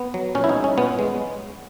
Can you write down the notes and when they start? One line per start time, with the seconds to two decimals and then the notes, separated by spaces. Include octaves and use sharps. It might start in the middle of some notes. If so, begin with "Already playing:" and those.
Already playing: B3
0.14 F#3
0.35 A#2 C#4
0.44 E4
0.49 D#4
0.57 G#3
0.64 C#4
0.78 A#2 B3
0.99 G#3